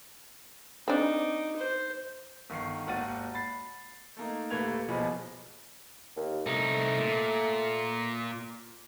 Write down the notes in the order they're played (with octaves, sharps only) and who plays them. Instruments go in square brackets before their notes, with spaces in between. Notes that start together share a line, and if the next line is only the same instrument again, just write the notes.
[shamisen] C4 D4 [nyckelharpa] D#4 D6
[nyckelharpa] C5
[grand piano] G1 D#3 C#6 C7
G#1 D#2 F#4 A6 D#7
B5 A6 C7
A3 A#3 D#4
D#1 A3 A#3 B4 G#6 F7
B1 B2 F3 G#4 B5
[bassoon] D#2
[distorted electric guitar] C2 D#4 [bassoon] A3
[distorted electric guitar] A#2